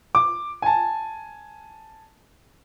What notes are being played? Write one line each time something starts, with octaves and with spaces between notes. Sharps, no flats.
D6
G#5 A5